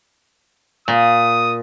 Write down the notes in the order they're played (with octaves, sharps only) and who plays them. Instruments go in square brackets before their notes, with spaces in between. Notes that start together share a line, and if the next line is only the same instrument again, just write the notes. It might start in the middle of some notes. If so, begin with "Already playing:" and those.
[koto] A#2 [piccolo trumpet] D#6